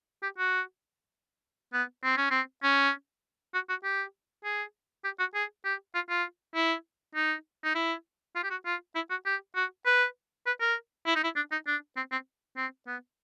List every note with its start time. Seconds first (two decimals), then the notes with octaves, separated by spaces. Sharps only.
0.23 G4
0.38 F#4
1.74 B3
2.04 C4
2.17 C#4
2.31 C4
2.63 C#4
3.54 F#4
3.69 F#4
3.84 G4
4.44 G#4
5.05 G4
5.19 F#4
5.35 G#4
5.65 G4
5.95 F4
6.09 F4
6.55 E4
7.15 D#4
7.64 D#4
7.75 E4
8.36 F4
8.44 G4
8.51 F#4
8.66 F4
8.95 E4
9.10 F#4
9.26 G4
9.55 F#4
9.86 B4
10.47 B4
10.61 A#4
11.07 E4
11.16 D#4
11.24 E4
11.36 D4
11.52 D#4
11.67 D4
11.97 C4
12.12 C4
12.57 C4
12.87 B3